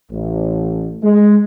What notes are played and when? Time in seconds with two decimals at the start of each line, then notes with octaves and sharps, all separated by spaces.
0.11 A1
1.03 G#3